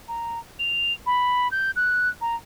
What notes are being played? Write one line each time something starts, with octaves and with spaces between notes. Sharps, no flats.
A#5
F7
B5
G6
F#6
A#5